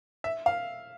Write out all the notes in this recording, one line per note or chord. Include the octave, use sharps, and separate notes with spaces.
E5
F5